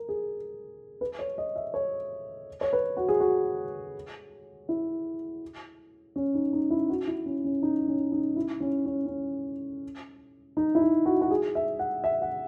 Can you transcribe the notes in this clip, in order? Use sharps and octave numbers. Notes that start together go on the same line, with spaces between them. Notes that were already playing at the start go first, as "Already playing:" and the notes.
Already playing: A#4
G#4
B4
C#5
D#5
E5
C#5
C#5
B4
F#4
G#4
F#4
E4
C#4
D#4
D#4
E4
F#4
E4
C#4
C#4
D#4
C#4
D#4
E4
C#4
C#4
C#4
D#4
E4
D#4
F#4
F#4
G#4
E5
F#5
E5
F#5